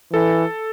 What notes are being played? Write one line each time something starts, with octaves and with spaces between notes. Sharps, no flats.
E3 A4